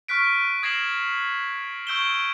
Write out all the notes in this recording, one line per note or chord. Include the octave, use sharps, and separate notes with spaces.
C#6 F6 F#6 B6 D7
D#6 G#6 A#6 C7 E7 F#7
C#6 E6 G6 D7 E7 G7